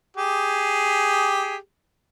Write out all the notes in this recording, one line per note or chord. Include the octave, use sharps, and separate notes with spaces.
G4 G#4